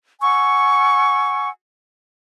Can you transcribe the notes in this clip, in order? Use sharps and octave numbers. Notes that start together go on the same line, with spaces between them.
F#5 G#5 C#6 E6